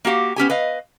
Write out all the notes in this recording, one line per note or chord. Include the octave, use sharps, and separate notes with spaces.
A#3 F#4 G4 F5
B3 C#4 G4 G#5
B4 D#5 F5